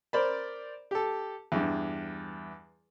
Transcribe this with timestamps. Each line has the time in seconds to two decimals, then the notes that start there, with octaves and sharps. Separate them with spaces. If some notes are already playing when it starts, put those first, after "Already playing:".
0.13 A#4 C5 D5 B5
0.91 G4 A4
1.52 E2 G2